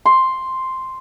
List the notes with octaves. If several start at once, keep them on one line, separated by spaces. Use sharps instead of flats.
C6